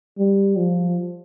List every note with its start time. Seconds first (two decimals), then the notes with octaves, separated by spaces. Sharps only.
0.18 G3
0.57 F3